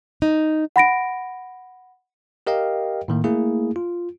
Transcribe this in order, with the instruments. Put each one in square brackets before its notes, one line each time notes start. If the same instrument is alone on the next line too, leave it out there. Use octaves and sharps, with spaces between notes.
[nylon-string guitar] D#4
[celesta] F#5 B5 A#6 D7
[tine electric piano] G4 A#4 D#5 F5 G5
A2 D#3 A#3
A3 A#3 E4 G#4
F4